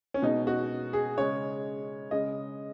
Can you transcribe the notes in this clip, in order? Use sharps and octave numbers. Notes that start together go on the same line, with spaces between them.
C#4
B2 G#3 D#4
F#4
G#4
C#3 G#3 C#5
C#3 G#3 D#5